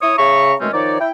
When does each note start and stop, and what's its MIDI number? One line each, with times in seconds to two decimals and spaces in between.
0.02 0.17 64
0.02 0.17 73
0.02 0.17 87
0.18 0.53 49
0.18 0.53 68
0.18 0.53 76
0.18 0.53 82
0.18 0.53 85
0.60 0.68 47
0.60 0.68 51
0.60 0.68 56
0.60 0.68 57
0.60 0.68 60
0.60 0.68 61
0.73 0.98 51
0.73 0.98 53
0.73 0.98 63
0.73 0.98 73
0.73 0.98 74
1.00 1.11 64
1.00 1.11 79